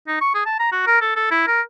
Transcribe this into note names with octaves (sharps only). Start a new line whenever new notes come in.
D#4
C#6
G#4
A5
A#5
F#4
A#4
A4
A4
E4
A#4